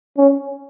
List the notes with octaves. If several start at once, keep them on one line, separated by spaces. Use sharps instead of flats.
C#4